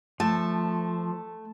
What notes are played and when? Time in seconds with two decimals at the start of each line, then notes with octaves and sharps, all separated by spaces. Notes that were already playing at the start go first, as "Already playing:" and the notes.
0.20 F3 A3 A5